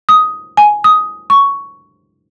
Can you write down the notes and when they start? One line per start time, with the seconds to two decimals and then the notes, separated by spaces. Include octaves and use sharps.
0.09 D#6
0.57 G#5
0.84 D#6
1.30 C#6